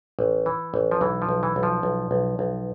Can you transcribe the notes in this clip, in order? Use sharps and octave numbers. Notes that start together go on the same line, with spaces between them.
A1
E3
A1
F3
B1 E3
F3
B1
E3
B1
F3
B1
B1
B1